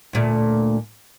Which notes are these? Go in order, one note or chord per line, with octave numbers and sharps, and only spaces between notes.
D2 A#2 A3